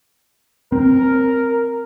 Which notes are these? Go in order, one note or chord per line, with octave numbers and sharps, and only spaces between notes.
C4 A#4